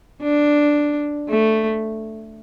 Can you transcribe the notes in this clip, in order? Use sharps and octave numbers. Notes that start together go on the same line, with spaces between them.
D4
A3